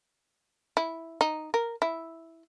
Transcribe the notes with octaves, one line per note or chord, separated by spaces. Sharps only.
E4
D#4
A#4
E4